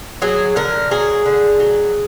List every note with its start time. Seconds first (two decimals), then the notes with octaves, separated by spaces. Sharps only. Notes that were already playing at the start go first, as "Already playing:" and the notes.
0.22 F#3 G#4
0.56 D3 A#4
0.91 F#3 G#4
1.26 D3
1.60 F#3